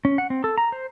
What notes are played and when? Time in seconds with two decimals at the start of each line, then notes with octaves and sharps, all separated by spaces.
0.05 C#4
0.18 F#5
0.30 C4
0.44 A4
0.58 A#5
0.72 C5